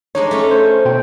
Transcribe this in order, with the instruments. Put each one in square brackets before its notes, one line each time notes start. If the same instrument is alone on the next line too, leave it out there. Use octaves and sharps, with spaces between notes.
[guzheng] G#3 D4 D#4 [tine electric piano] C#5
[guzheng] A3 C#4
[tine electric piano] C5
B2 C5 G5